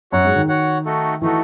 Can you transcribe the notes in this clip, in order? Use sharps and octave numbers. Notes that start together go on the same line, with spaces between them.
F#2 F#4 C#5 F#5
G#2
D#3
F#4 C#5 F#5
A3 D#4 F#4 A4
E3 A3 D#4 F#4 A4